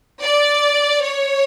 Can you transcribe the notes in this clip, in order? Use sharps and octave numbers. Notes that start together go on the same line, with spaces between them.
D5
C#5